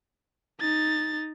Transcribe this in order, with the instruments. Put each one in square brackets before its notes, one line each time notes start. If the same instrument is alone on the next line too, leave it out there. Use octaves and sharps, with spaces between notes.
[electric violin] D#4 A6